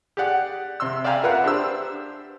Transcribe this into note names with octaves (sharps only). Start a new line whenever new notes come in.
G4 G#4 D5 F#5
C3 C6 E6
D5 E5 F5 G5 G#5 A#5
F4 A#4 B4 E5 F#5
D4 G4 C5 E6